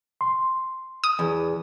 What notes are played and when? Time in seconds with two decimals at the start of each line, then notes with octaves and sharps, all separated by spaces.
0.21 C6
1.04 D#6
1.19 E2